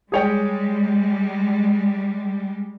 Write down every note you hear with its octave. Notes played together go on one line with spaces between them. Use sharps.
G3 G#3 G#4 C#5 G5